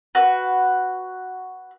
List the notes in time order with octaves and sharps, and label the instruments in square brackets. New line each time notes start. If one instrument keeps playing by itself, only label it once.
[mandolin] F#4 B4